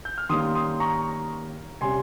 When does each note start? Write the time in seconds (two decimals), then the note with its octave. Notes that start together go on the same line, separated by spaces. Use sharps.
0.05 G6
0.18 F6
0.29 D#3 G3 A#3 C#4 C6 D#6
0.55 C6 D#6
0.80 A#5 C#6
1.81 C3 G3 C#4 G#5 C6